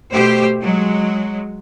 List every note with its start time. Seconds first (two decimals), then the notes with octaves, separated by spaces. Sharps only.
0.11 B2 A3 G4 C5
0.61 F#3 G#3